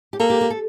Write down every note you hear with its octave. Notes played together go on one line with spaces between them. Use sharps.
G4
A#3 A4
G4
G4
A4